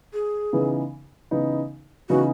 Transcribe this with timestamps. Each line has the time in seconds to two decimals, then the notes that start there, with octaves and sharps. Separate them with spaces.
0.13 G#4
0.53 C#3 E3 B3 D#4
1.31 C#3 E3 B3 D#4
2.09 C#3 E3 B3 D#4 F#4